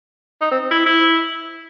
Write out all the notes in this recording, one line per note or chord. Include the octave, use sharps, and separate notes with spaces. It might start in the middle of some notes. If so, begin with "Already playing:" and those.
D#4
C4
E4
E4